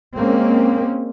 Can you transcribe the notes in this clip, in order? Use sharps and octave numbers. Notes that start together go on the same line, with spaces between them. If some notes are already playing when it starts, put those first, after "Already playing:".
G#3 A#3 C4 C#4